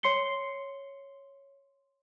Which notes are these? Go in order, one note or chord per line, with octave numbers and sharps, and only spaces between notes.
C#5 C6 C7 C#7 G7